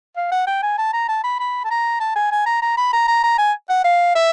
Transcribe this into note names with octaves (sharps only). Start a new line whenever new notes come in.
F5
F#5
G5
G#5
A5
A#5
A5
B5
B5
A5
A#5
A5
G#5
G#5
A#5
A#5
B5
A#5
A#5
A#5
G#5
F#5
F5
E5